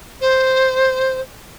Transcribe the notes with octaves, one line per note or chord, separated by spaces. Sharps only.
C5